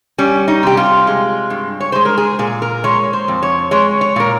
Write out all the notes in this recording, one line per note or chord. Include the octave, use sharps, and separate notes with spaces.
G3 C#4
D#4
C3 G4
F4
G#3
G2
C#5
G#3 C5
A#4
G#4
A#2 G#4
A#4
G#3 C#5
C5
F2
C#5
G#3 C#5
C#5
A#2 A#4